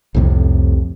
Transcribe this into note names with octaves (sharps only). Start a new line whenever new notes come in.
C2 F2 A2 C3